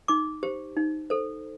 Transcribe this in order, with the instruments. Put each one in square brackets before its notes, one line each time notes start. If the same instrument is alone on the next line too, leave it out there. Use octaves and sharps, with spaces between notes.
[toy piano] D#4 D6
G4 C5
D#4
A4 C5